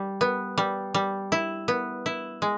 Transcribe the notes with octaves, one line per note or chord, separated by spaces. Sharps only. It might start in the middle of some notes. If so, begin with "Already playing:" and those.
Already playing: G3
B3
G3
G3
E4
B3
E4
G#3